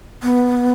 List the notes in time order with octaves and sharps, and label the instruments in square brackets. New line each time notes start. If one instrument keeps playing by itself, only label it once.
[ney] B3